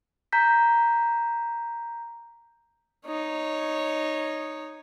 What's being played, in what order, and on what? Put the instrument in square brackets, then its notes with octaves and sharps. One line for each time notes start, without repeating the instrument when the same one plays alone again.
[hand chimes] A#5 G6 B6
[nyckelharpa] D#4 C#5